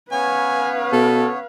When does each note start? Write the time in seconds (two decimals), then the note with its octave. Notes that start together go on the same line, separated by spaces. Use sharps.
0.12 B3 C#4 B4 C#5 F5 G#5
0.93 B2 A4